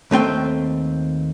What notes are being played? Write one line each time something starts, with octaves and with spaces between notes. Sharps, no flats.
D#2 A3 C4 G5